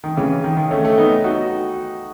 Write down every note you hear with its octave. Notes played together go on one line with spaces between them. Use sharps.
D#3
C#3 E3
D#3
D#3
A3 C#4
A3 C#4
B3 D#4
D#4 F#4